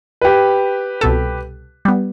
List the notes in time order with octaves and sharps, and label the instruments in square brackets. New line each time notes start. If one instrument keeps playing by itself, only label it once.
[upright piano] G4 B4
[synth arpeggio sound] C2 B2 A4
G3 B3